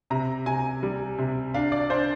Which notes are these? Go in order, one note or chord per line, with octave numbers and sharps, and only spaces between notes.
C3 A#5
C3 G#5
G3
C3
D4 F5
D5
D4 C5